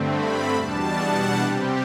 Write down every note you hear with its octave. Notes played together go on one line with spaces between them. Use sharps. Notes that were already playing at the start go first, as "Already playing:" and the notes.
Already playing: G2 D3 A3 C4
B5
E2 B2 G3 D4 A5
F#5
C3 G3 C4 G4